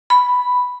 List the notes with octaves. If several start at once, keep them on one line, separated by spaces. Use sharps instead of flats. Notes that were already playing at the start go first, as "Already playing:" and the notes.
B5